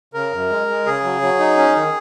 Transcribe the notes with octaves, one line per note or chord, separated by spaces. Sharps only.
C#3 A#4
F#2
G#3
G#3
C#3 G#4
F#3
F#3
D#4
C#4
D#3